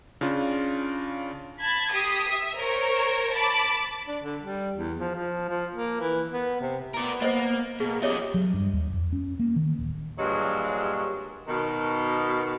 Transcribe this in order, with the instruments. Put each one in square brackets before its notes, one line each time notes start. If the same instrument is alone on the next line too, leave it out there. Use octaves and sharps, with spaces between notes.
[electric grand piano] C#3 D4 F4
[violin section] A5 B5 G#6
G4 D#6 B6 C7
E5
A#4 C5 C#5
A5 B5 D6
[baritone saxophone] D4
D3
G3
E2
F3
F3
F3
A#3
E3
B3
C3
[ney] B3 [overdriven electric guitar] A#4 D5
[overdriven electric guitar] A#3 [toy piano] C5 D#5
[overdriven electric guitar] B2 [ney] A#3 [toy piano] G#4
[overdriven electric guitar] F3 D#5 [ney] G4 [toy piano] C#5 E5
[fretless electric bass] F#3
G2
D#2
F2
C#4
A#3
D#3
D1
[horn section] G2 A#2 F#3 G#3
B2 D#3